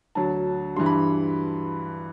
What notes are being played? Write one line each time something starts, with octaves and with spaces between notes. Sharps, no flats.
D2 D3 F#3 A5
G2 E3 C6
B5